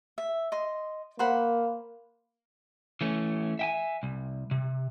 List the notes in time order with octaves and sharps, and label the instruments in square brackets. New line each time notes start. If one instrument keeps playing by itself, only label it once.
[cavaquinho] E5
D#5 C6
[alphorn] A#3 [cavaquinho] C5 F#5 B5
[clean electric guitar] E3 A3 C#4
E5 G5 G#5
C2
C3